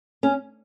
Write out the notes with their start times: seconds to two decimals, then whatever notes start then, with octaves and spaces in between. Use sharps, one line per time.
0.23 C#4